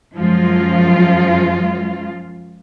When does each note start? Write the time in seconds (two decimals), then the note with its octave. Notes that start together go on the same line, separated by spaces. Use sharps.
0.16 F#2 F3 G#3 F4